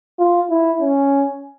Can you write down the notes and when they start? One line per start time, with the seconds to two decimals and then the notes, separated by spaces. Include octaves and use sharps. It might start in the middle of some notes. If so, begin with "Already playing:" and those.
0.19 F4
0.50 E4
0.82 C#4